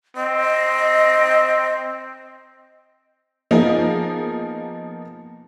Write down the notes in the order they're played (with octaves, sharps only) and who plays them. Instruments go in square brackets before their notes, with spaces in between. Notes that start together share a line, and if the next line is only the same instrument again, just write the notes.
[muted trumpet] C4 [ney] D#5
[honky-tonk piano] F3 A#3 B3 D#4 G#4